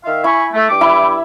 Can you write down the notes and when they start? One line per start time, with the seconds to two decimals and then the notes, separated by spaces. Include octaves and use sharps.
0.04 D#3 E5 F5
0.24 E4 G#5 B5 C#6
0.53 A3
0.69 G2 G5 D6
0.81 E4 E5 B5